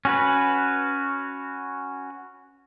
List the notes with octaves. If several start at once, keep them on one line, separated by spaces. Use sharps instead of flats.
C#4 F#4 B4